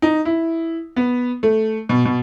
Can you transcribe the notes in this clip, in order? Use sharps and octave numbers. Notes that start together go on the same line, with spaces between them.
D#4
E4
B3
A3
B2
B2